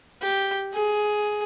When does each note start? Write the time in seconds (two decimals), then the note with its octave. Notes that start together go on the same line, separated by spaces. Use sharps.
0.22 G4
0.74 G#4